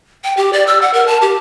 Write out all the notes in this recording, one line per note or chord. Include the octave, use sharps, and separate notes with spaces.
G5
G4
D5
E6
F#5
A#4
A5
G4